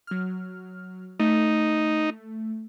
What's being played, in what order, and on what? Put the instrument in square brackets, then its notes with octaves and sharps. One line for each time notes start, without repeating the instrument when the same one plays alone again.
[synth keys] F#3 F6
[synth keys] A3 [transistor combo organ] D#4